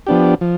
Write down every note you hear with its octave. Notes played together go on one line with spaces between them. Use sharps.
F3 B3 D4 G4
F3